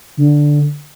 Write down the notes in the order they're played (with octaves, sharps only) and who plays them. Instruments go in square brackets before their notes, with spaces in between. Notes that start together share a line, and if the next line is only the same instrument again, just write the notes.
[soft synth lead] D3